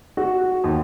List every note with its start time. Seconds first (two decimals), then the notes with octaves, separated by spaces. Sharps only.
0.17 F#4
0.64 D#2